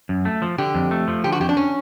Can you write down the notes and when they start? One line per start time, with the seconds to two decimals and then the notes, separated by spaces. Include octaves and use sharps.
0.09 F#2
0.25 A3
0.42 F3
0.58 D3 G4
0.75 F2
0.91 A3
1.08 F3
1.24 D3 G4
1.32 F#4
1.40 F2 G4
1.49 D4
1.57 C#4